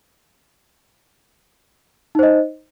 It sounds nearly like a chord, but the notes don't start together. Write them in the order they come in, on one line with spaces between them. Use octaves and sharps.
D#4 C5 D#5